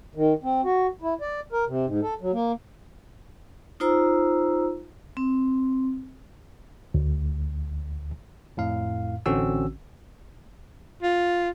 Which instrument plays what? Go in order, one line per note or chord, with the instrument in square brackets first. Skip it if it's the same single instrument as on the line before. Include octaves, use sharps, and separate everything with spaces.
[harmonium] D#3
C4
F#4
E4
D5
A#4
C3
G#2
A4
F#3
A#3
[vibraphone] D#4 F4 C5 A#5 E6
C4
[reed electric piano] D2
[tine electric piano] F2 A2 F5
A1 D3 C4 C#4 F#4 E6
[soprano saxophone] F4